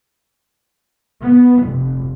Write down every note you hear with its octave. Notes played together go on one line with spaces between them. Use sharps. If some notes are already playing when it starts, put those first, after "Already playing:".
B3
F1